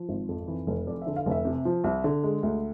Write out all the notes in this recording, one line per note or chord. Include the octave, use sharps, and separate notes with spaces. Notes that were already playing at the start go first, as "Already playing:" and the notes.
Already playing: F3
G#1
F2
E3
F1
F2 D5
E5
D3
F5
F1 E5
C3
F3
C2
D3
G#3
D2